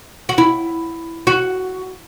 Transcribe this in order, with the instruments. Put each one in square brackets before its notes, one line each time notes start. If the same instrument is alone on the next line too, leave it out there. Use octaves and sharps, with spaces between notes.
[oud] F#4
E4
F#4